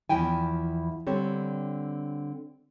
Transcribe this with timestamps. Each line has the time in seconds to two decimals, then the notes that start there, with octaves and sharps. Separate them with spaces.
0.09 E2 F3 E4 G5 G#5
1.07 D3 G3 C4 C#5